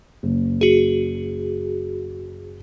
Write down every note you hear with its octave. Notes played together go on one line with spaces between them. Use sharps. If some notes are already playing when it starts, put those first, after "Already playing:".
F#1
F#4 G#4